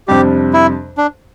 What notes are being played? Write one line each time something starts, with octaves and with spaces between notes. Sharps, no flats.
F2 C3 G3 D4 G4
E4
D4